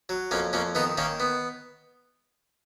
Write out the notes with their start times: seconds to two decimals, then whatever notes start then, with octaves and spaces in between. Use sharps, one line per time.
0.09 F#3
0.31 F2 A#3 C#4
0.53 F2 A#3 C#4
0.75 D#3 B3 D#4
0.97 D#3 A#3 C#4
1.20 B3